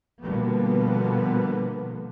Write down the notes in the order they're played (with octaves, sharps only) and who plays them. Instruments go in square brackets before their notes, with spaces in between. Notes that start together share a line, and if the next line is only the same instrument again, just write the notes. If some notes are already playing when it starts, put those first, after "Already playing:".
[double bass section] B2 D3 F3 G3 A#3 B3